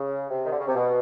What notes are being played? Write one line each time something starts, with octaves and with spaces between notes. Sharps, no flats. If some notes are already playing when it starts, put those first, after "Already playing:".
Already playing: C#3
C3
D#3
D3
C#3
C3
B2